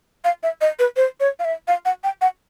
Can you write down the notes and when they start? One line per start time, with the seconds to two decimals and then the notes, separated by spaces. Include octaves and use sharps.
0.24 F5
0.43 E5
0.61 D#5
0.79 B4
0.97 C5
1.20 C#5
1.39 F5
1.45 E5
1.68 F5
1.85 F#5
2.04 G5
2.21 F#5